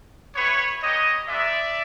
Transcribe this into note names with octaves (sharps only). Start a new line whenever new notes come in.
B3 E4 G4 B4 C#5
B3 D#4 G4 C#5 D#5
G#3 B3 D#4 D5 E5